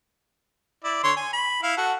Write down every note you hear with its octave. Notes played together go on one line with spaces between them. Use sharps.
E4 D5
D3 C#5 C6
G#5
B5
E4 F5
F#4 A4